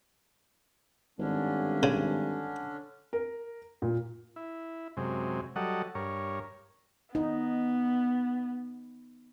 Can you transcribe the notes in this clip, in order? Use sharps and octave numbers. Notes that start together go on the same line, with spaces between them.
G#1 G2 D3 C#4 D4
C#3
A#4
A#2
E4
F#2 C3 G#3
F#3 G3 A4 D#5 F#5
G2 A#4 C#5
B3 D#4